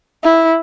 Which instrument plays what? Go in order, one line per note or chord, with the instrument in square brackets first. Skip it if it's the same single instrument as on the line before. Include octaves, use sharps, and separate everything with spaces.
[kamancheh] E4